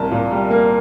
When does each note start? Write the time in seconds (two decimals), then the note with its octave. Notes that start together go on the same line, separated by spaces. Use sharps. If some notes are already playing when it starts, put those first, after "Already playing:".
Already playing: C2 A#3 A5
0.11 A#2
0.31 G3
0.50 A#3